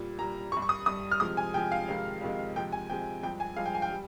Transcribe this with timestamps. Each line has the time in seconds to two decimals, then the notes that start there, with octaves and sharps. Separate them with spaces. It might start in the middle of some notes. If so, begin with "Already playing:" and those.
Already playing: A#2 G3
0.18 A#2 G3 A#5
0.52 G2 G3 C#6
0.62 C#6
0.69 D#6
0.86 G2 G3 D#6
1.11 F6
1.20 C3 F3 G#3 D#6
1.37 G#5
1.53 C3 F3 G#3 G5
1.72 F5
1.88 F2 C3 D#3 G#3
2.21 F2 C3 D#3 G#3
2.56 C3 F3 G#3 G5
2.72 G#5
2.90 C3 F3 G#3 G5
3.23 G2 F3 G#3 G5
3.40 G#5
3.56 G2 F3 G#3 F5
3.65 G5
3.75 G#5
3.82 G5
3.91 G3